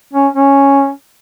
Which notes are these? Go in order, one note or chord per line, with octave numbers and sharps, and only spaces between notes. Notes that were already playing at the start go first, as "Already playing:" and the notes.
C#4
C#4